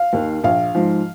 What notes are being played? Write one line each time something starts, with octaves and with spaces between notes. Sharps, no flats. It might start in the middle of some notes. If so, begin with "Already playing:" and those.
Already playing: F5
D#2 D#3
A#1 F5
G#2 F3